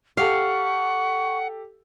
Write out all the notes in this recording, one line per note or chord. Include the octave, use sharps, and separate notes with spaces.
G4 A4 F5 F#5 C#6